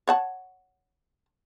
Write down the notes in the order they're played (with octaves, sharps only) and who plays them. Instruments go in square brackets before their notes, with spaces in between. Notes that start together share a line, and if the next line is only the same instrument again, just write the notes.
[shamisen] C#5 F#5 A5